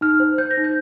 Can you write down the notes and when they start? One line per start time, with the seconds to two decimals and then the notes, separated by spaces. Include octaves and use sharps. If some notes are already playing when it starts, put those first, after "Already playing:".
0.01 D#4 F6
0.20 C5
0.38 C5 G6
0.51 A#6
0.57 D#4
0.64 G6